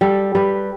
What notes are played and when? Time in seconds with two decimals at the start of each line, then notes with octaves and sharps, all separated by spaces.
0.01 G3 A4
0.35 G3 B4